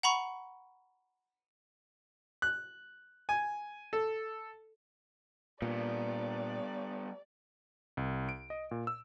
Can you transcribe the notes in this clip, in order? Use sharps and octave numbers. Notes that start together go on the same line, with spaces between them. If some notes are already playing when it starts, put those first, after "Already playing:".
F#5 A#5 B5 C#6
F#6
G#5
A4
A#2 G3 B3 D5
C2
D7
D#5
A#2
E6